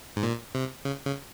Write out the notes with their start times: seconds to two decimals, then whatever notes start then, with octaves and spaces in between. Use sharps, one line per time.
0.16 G#2
0.23 A#2
0.55 C3
0.85 C#3
1.05 C#3